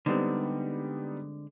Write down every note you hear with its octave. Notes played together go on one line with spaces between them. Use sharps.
D3 G3 G#3 B3 C4 D#4